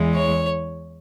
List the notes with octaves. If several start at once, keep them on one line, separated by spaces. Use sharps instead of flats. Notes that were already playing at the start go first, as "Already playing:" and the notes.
Already playing: E2 E3 G#3
C#5